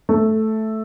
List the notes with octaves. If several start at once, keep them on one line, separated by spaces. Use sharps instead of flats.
A3